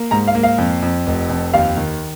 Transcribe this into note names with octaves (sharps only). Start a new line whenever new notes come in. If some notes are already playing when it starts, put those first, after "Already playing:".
Already playing: A#3
G#2 A#5
F5
A#3
F5
F2
F2
F1
F2
D#2 F5
D#3